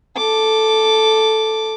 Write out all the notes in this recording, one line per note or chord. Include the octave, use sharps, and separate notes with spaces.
A4 D6